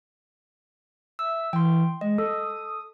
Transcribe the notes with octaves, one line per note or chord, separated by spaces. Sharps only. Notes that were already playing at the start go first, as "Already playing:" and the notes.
E5 E6
E3 G5 C6
G#3 D#5
A4 D#6